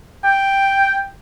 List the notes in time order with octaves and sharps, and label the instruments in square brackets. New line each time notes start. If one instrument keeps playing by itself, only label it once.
[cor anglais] G5